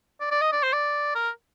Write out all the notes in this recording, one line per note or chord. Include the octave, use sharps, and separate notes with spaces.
D5
D5
D#5
D5
C5
D5
A#4